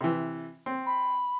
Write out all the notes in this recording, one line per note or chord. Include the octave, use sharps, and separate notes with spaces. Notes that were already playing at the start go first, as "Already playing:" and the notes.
C3 E3
C4
B5